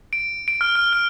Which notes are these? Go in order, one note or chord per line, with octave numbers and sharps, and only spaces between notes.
D7
D7
F6
F6
F6